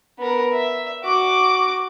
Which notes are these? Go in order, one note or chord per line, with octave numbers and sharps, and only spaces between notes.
B3 A#4
E5
F#4 D6